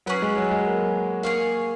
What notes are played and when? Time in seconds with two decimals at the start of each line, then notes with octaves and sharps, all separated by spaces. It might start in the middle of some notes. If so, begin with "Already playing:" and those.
0.06 F#3 C#4 G#4 B4 F#5
0.22 G#3
0.36 F#3
0.51 G#3
0.66 A#3
1.23 A#3 G#4 C#5 F5